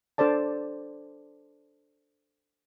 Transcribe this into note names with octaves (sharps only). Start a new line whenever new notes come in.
D4 A4 C5 D5 A5